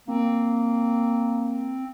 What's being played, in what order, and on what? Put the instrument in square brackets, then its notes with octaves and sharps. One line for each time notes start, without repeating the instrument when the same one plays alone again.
[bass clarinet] A#3 [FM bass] C4